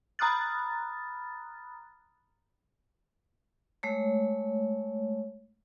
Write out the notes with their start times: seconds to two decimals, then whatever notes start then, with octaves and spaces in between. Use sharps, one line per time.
0.19 A#5 B5 D#6 F6 F#6 A6
3.83 G#3 A3 C#5